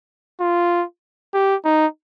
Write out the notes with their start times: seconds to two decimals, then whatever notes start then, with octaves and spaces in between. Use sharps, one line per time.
0.40 F4
1.33 G4
1.65 D#4